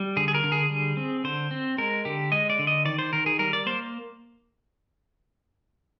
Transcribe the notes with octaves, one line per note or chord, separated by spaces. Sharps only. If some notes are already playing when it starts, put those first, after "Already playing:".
Already playing: G3
D3 G#4
G#4
A#4
D3
G#4
G3
C4
D3 C5
C4
G#3 A#4
D3 G4
G#3 D#5
D5
D3
D#5
D#3 D5
C5
D#3 A#4
G#4
G3 A#4
D5
A#3 C5